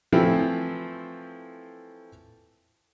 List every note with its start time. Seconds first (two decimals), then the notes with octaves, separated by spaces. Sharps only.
0.12 E3 F3 A3 C4 E4